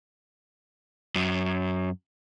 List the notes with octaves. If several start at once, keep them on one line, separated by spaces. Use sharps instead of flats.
F#2